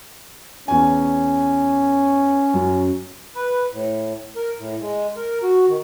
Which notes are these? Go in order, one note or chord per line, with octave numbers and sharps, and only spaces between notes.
E2 C#4 G#5
F#2 F#3
B4
A2
A#4
A2
G#3
A#4
F#4
D#3